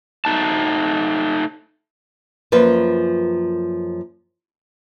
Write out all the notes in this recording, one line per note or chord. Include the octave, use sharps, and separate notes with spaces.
A3 D#4 A5
F#2 F3 A#3 B4